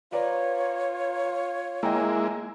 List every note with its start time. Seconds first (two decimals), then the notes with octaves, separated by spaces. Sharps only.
0.12 F4 B4 C#5 D5 A#5
1.83 G#3 A#3 E4 D#5 G5 A#5